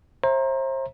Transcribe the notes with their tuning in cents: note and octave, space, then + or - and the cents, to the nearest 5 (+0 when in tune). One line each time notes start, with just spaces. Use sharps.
C5 +35 E5 +0 A#5 +5